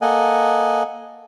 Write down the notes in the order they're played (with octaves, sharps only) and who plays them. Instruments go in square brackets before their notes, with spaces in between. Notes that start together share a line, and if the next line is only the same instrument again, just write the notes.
[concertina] A#3 A4 D#5 F#5 G#5